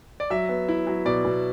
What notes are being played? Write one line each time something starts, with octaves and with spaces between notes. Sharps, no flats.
D5
F#3 E5
B3
E4
F#3
B2 D5
B2